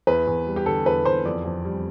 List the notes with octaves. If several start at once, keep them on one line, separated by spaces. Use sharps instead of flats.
E2 B4
E2
G3
G4
D3 A4
E2 B4
E2 C5
F2 D5
F2
G3